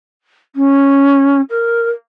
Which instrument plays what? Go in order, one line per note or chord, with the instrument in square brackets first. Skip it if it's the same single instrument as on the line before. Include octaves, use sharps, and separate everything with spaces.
[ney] C#4
A#4